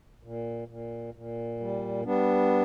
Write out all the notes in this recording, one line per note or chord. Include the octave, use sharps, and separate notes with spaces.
A#2
A#2
A#2
G3
G3 B3 D4